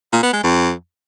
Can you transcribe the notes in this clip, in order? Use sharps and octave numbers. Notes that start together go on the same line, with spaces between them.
A#2
B3
G#3
F2